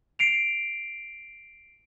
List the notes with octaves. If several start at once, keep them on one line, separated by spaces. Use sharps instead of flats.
C7 D7 F7